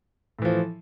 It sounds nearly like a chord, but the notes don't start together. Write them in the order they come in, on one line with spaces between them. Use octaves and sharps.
A2 E3 F3